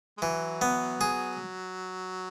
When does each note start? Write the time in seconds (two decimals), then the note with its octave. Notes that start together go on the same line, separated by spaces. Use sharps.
0.17 G#3
0.22 E3 F#3
0.62 B3
1.01 G#4